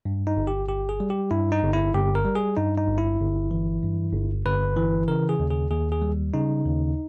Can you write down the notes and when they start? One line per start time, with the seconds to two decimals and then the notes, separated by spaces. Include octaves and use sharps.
0.05 G2
0.27 D#4
0.37 G1
0.47 G4
0.68 G1 G4
0.89 G#4
1.00 G3
1.10 G4
1.30 G2 E4
1.52 D#4
1.63 G1
1.73 E4
1.94 G1 G4
2.15 A#4
2.25 G3
2.36 G#4
2.57 G2 D#4
2.78 D#4
2.88 G1
2.98 E4
3.19 G1
3.51 E3
3.83 G2
4.13 G1
4.46 G1 B4
4.77 E3
5.08 C#3 A#4
5.29 G#4
5.40 D#2
5.50 G#4
5.71 D#2 G#4
5.92 G#4
6.02 G3
6.34 C#3 D#4
6.65 D#2